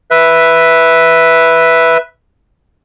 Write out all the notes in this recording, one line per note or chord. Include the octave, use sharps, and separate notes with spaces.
B4 E5